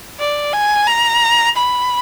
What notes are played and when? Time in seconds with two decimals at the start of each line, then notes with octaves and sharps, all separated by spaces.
0.19 D5
0.53 G#5
0.87 A#5
1.56 B5